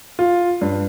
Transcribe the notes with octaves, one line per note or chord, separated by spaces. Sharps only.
F4
G2